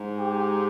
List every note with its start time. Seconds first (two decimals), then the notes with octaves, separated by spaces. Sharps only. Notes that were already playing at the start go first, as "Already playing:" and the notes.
Already playing: G#2
0.20 G4